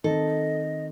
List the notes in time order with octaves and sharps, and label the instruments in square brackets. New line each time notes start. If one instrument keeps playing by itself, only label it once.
[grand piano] D#3 C4 [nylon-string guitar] A4 [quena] D#5